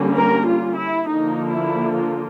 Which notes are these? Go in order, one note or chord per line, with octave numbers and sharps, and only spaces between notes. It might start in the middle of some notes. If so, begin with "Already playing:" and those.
Already playing: D3 G3 A#3 C#4
A#4
F4
E4
D3 F3 A#3 D#4
E4
F4